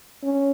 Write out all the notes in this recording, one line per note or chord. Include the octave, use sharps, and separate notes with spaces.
C#4